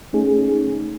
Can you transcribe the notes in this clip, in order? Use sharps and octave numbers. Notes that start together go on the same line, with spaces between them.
A3 C#4 D#4 G#4